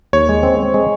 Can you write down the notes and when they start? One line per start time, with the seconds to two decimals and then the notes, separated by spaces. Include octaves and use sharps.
0.13 D#2 C#5
0.29 G#3
0.43 C4
0.59 C4
0.74 G#3